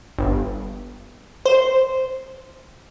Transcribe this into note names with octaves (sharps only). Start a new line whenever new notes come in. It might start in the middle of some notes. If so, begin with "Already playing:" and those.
G1
C5